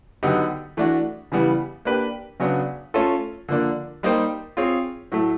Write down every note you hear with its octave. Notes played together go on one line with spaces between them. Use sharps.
D3 F#3 B3 D#4 G4
E3 A3 D4 F#4
C#3 E3 G3 B3
A#3 D4 G4 B4
C#3 F#3 B3 D4
A3 C#4 F4 A4
D3 F3 A#3 D4
G3 A#3 D#4 G4 C5
C4 F4 G#4 C#5
A2 F#3 A3